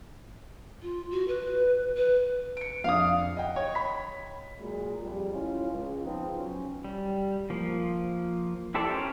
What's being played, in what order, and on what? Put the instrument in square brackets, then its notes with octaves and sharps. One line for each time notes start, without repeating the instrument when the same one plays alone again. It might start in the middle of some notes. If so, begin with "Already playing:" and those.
[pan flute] F4
F#4
B4
B4
[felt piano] C#7 D7
[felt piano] F2 D4 [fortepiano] F5 D#6
[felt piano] D#5 F#5 G5
[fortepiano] C#5
[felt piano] B5 B6
[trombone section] A#2 F#3 G#3
F2 F3 G3
F#2 A2 C#4 F4
C#2
F3 B3 C4 D#4
F#3 C#4
[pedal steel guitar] G3
F3 A#3
E4 G4 A4 C5 D5
C#4 A#4 C5 C#5 G5